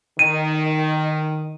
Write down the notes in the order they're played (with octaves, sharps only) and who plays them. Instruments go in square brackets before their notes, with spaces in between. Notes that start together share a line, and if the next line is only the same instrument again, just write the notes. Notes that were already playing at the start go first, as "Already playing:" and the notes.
[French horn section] D#3 [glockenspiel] D#7